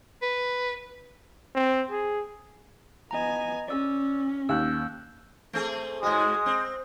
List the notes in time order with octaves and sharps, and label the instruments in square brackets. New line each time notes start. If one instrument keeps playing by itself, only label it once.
[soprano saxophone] B4
[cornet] C4
G#4
[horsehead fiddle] B3 G#5 [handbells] D#5 A#5
[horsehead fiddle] C#4 [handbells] D5 E6
[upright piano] D#2 [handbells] E6 F#6 G6
[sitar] A3 C4 G#4
[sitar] G#2 F#4 [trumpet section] G#3 [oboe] D#6
[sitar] C4